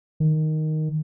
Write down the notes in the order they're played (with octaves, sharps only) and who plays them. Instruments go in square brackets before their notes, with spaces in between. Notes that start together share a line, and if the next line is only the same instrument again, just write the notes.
[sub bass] D#3